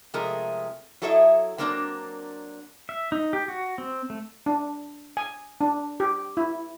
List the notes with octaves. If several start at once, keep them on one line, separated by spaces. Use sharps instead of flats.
C3 F3 G#3 A3 G#4 A#4
F#3 E4 A4 C#5 D#5 E5
F#3 A#3 C4 D4 A#4 D5
E5
D#4
G4
F#4
C4
A3
D4
G#5
D4
G4
E4